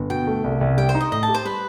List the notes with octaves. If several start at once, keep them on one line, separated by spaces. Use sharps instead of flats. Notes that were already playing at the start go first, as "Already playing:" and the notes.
Already playing: G1
B2 G5
A3
C2
C2
G3 G5
C5
D#4
D#5
A2 D#5
A5
G4
C5
G3 B4